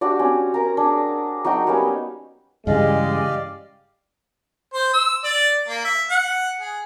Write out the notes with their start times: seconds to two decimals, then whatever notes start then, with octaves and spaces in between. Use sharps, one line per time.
0.01 D4 F#4 G4 D5
0.19 C4 C#4
0.54 A#4 A#5
0.77 D4 G#4
1.45 F#3 D#4 F#4 G5
1.67 G3 A#3 B3 C#4
2.67 G2 C#3 E3 G#3 G4 D5 D#5 F5
4.73 C5
4.93 E6
5.24 D5
5.68 A#3
5.84 E5
6.10 F#5
6.61 G#4